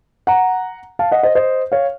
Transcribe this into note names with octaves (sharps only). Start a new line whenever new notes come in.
F#5 A#5
F5 A5
D#5 F#5
C5 D#5
C5 D#5
C#5 F5